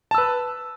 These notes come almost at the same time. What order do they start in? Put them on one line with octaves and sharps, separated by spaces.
A5 E6 B4